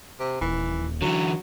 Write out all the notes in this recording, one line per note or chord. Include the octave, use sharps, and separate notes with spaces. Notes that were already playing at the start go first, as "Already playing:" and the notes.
C3
D#1 E3
D3 E3 F#3